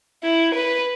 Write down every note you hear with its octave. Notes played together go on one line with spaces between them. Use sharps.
E4
B4